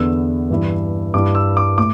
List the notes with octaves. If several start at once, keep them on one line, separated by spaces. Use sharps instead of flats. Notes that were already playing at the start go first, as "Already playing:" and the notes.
Already playing: E2 D3 B3 D4 E6
G2 E3 G3 E4
G2 G3 E4 D6
E6
D6
A2 D6